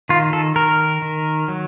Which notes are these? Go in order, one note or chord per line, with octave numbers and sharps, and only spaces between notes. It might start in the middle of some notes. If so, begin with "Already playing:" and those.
D#3 F4
A4
D#3 A#4
D#3
F#3